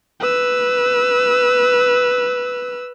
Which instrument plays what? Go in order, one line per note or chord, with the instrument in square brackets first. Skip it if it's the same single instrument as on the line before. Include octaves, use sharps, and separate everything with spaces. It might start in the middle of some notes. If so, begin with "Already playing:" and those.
[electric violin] B4 E6